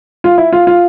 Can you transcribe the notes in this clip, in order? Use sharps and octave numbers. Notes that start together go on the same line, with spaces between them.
F4
E4
F4
F4